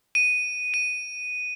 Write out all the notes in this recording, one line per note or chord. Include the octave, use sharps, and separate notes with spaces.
D#7
D#7